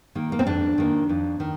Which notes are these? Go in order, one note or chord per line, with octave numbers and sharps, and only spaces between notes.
D#3 A#3
A#3
C4
F2 D4
D#3 A#3
F2
D#3